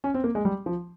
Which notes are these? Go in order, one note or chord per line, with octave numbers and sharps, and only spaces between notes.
C#4
C4
A#3
G#3
G3
F3